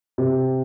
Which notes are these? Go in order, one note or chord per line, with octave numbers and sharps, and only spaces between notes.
C3